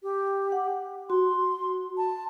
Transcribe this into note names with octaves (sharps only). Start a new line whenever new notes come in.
G4
F#5
F#4 C6
A5